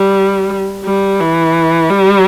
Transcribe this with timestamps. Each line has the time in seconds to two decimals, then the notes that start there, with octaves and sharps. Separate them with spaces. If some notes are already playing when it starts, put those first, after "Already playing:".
Already playing: G3
0.84 G3
1.20 E3
1.90 G3